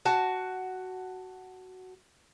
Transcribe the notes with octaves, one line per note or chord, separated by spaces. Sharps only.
F#4 A5